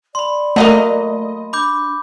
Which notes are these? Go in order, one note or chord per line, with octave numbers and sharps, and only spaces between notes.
D5 B5 C6
F#3 A3 A#3 D#5
D4 B5 D6 G6